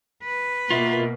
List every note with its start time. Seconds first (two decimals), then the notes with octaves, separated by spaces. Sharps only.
0.24 B4
0.70 B2 A#3 F4 E5